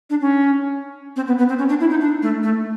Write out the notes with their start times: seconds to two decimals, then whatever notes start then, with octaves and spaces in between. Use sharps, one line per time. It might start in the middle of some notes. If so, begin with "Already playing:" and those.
0.10 D4
0.21 C#4
1.16 C4
1.27 B3
1.38 B3
1.49 C4
1.59 C#4
1.69 D4
1.80 E4
1.90 D#4
2.01 D4
2.22 A3
2.43 A3